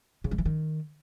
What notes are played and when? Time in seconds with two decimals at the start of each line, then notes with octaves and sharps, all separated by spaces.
0.24 C#3
0.31 G3
0.38 E3
0.45 D#3